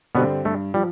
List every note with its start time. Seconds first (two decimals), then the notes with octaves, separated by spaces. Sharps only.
0.15 G2 B2 D3 G3 B3 C4
0.45 G2 A3
0.74 F3 G3